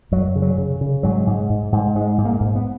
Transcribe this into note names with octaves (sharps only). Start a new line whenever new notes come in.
F#2 F#3
C#3
F#3
C#3
C#3
G#2 F#3
G#2
G#2
G#2
G#2 G#3
G#2
A#3
G#2
B3